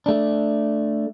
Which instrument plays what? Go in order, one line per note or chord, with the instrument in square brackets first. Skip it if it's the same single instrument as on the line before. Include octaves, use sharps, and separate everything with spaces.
[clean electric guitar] A3 D4